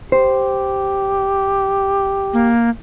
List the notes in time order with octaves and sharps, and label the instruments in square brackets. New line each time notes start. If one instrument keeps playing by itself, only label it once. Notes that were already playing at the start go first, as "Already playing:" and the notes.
[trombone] G4 [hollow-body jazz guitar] C5
[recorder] A#3